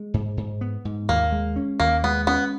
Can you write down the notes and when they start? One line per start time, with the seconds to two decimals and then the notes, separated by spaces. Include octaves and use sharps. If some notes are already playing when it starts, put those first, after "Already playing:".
Already playing: G#3
0.14 G#2
0.37 G#2
0.61 B3
0.85 G#2
1.09 D#2 A#3
1.32 G#3
1.56 C#4
1.80 D#2 A#3
2.04 G#3 B3
2.27 B3 C#4